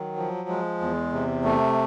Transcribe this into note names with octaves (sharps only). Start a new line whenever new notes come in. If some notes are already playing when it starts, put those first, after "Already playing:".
Already playing: D#3 F#3
F3
G#3
E2
C3
A3